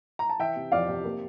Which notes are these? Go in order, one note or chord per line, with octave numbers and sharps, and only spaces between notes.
A#5
A5
E3 E5 G5
C3
F2 D5 F5
C3
A#3